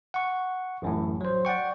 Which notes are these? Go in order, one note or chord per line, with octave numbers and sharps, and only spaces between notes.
F#5 C#6
A1 F#2 A2
F#3 C5
D5 F#5 G5 C#6